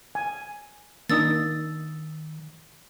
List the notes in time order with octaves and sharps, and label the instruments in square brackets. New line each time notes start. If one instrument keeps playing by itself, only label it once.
[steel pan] G#5
[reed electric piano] D#3 [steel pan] A#3 D4 D#4 [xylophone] D#6 E6 A6